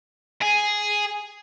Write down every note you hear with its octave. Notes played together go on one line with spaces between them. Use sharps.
G#4